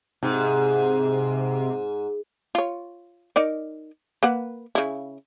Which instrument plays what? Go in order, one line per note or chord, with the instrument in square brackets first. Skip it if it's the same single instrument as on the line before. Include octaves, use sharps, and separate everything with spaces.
[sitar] G#2 [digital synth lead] C3
[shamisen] F4 C#5
D#4 A#4 D5
A#3 B4 F#5
C#3 E4